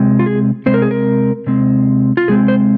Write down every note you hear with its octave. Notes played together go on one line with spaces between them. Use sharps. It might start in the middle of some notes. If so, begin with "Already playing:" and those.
Already playing: C3 G#3 C4
F4
G#4
C3 G#3 C4 C5
A#4
G#4
A#4
C3 G#3 C4
F4
C3 G#3 C4 G#4
C5